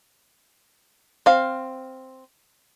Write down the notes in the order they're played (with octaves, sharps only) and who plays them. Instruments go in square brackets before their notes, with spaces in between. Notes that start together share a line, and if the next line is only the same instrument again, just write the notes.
[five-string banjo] C4 F5